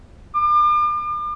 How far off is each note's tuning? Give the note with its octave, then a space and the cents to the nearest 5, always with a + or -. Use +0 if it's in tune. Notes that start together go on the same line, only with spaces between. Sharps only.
D6 +40